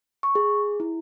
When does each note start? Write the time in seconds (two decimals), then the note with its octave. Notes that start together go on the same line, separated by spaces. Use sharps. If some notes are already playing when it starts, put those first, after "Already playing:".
0.23 C#6
0.35 G#4
0.80 E4